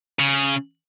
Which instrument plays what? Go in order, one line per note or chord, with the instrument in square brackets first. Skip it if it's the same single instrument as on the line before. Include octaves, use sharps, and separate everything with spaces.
[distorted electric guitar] C#3